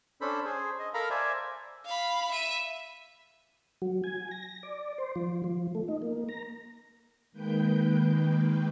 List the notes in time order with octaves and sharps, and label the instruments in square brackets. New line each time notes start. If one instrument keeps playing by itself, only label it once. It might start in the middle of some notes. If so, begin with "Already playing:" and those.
[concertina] C#4 D4 A4 C5 B5
G#4 C5
D#5
A4 A#4 F5 A#5 B5
C5 D5 E5 G#5
[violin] F5 B5
E5 D#7
[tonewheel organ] F#3
G#5
A#6
D5
C5
F3
F3
A3
D#4
A#3
A#5
[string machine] D#3 G#3 A#3 B4 G5 G6